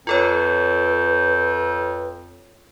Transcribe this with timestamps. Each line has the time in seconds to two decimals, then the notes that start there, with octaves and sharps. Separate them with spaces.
0.07 F2 F4 A4 B4 C#5